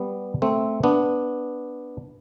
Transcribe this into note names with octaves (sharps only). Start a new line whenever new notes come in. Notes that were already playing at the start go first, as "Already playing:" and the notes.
Already playing: G3 B3
A3 C4
B3 D4